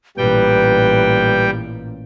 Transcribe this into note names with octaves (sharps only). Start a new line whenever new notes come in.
A1 A#2 G3 B4 G5